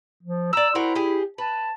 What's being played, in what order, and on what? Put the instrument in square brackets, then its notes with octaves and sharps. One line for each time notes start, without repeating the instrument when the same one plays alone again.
[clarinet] F3
[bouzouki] D5 A#5 [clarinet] E6
[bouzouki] C4 F#4 A#4 [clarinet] E4
[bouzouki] G4 G#4
[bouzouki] B4 [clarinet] A5